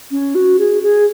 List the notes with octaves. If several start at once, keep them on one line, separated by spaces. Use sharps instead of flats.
C#4
F#4
G#4
G#4